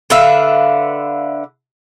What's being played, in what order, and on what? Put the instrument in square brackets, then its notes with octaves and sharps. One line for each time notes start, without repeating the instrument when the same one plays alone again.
[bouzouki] D3 B4 E5 F5